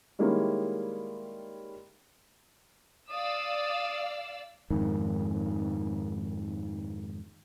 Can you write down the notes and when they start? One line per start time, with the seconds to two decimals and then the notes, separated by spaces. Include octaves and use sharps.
0.19 D#3 G3 G#3 A#3 C#4 E4
3.10 D5 F5 D#6 E6
4.70 F2 G#2 D#3